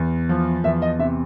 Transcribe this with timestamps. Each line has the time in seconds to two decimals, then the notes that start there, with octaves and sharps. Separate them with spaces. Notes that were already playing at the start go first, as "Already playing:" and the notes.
Already playing: E2
0.29 F3
0.64 E2 E5
0.82 D#5
0.99 C3 E5